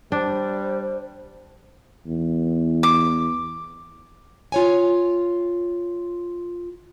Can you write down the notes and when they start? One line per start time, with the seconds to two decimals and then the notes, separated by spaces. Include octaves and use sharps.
0.12 G3 D4 C5
2.07 E2
2.83 D6
4.52 F4 C#5 G#5